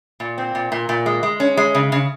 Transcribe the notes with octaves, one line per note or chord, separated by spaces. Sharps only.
A#2
C4
A#2
A#2
A#2
G#3
G#3
C#4
G#3
C#3
C#3